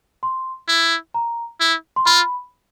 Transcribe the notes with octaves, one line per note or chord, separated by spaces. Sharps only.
C6
E4
A#5
E4
C6
F4 B5